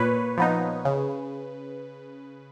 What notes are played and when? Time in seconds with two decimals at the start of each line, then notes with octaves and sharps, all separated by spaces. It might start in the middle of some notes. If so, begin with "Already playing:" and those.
Already playing: A#2 B4 C#5
0.38 F3 B3 D#4
0.85 C#3